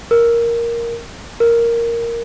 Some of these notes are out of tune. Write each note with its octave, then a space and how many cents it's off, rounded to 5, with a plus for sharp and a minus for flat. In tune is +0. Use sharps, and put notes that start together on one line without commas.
A#4 +5
A#4 +0